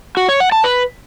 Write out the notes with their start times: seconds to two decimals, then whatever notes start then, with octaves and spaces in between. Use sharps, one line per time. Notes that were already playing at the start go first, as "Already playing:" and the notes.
0.17 F#4
0.29 C#5
0.40 F#5
0.52 A5
0.64 B4